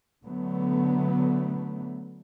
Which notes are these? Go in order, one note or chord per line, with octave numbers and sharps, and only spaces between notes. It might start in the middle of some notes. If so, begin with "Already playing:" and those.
D3 F#3 A3 B3